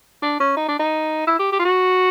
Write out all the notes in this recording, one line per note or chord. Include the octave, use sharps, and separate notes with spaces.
D4
C#4
D#4
D4
D#4
E4
G4
G4
F4
F#4